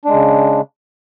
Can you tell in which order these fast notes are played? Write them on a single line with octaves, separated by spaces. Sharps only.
D4 G#3 C#3